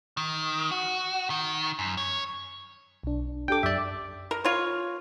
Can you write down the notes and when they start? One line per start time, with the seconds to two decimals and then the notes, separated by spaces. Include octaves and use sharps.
0.17 D#3
0.71 F#4
1.30 D#3
1.79 F#2
1.97 C#5
3.03 B1 D4
3.48 D4 G4 A4 G5 D6
3.63 F#2 D5 E5
4.31 A#4
4.45 F4 C#5